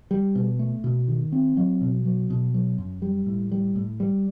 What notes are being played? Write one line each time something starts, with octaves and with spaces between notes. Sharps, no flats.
G3
B2
A3
B2
D#3
C4
F#3
B2
F#3
B2
F#3
F#2
G3
A2
G3
A2
G3